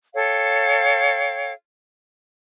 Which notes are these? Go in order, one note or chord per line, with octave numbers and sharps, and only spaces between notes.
A4 C#5 F5 G5